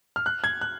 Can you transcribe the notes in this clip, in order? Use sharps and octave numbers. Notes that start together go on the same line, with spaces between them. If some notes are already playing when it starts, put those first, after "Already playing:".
F6
F#6
G#6
F#6